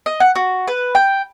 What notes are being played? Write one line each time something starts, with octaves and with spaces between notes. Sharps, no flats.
D#5
F#5
F#4
B4
G5